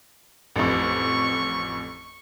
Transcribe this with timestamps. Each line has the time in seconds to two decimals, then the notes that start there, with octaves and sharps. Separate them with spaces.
0.56 A1 F2 C#6